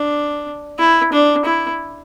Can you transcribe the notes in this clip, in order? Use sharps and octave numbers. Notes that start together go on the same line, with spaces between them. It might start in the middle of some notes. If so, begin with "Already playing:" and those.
Already playing: D4
E4
D4
E4